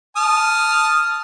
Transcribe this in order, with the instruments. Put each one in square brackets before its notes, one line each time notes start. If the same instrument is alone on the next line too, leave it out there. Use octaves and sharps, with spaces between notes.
[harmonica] A5 D#6 F6